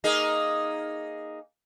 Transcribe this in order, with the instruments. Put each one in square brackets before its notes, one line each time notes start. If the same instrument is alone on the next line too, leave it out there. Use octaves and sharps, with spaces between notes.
[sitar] A#3 D#4 G#4